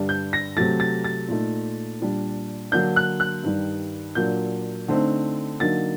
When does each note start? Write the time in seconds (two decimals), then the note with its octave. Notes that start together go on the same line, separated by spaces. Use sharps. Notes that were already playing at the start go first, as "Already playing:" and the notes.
Already playing: G2 D3 G3 D4
0.09 G6
0.33 A#6
0.56 C3 F#3 A3 A6
0.80 A6
1.04 A6
1.28 A#2 A3 D#4
2.01 A#2 G3 D4
2.72 D3 F#3 A#3 D4 G6
2.96 F#6
3.20 F#6
3.44 G2 D#3 G3
4.15 A#2 F#3 A#3 D4 G6
4.88 D3 A3 C4 D#4
5.60 D3 F#3 A#3 D#4 A6